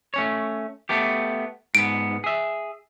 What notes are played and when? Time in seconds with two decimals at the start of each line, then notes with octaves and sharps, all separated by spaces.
0.14 A3 C#4 C#5
0.89 A3 B3 G4
1.75 G#2 B3 D7
2.24 G#4 E5